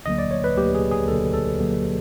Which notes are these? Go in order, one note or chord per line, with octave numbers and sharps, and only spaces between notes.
D2 D3 F#3 A#3 D#5
D5
C#5
B4
D2 D3 F#3 A#3 G4
G#4
G#4
D2 D3 F#3 A#3 A4
A4
D2 D3 F#3 A#3